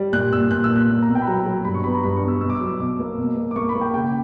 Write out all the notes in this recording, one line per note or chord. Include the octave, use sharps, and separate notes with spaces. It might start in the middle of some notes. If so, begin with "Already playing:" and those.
Already playing: G3
A#2 F#6
A#2 E6
A#2 F#6
E6
A#2
F#6
A#3
A#5
B2
G5
B5
F#3 A#5
F#3
G2 B5
C#6
B3 B5
A#5
G2 B5
C#6
B3
E6
B2 E6
D6
E6
F#3
E6
B2 D6
A#3
B2
A#3
D6
A#3 C#6
B5
A#3
G5
C#3 G5